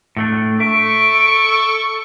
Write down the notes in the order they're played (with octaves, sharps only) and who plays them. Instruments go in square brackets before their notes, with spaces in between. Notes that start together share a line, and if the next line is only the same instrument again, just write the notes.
[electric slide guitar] A2 A3 D4
[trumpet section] A4 C#6 [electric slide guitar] E5 [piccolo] D7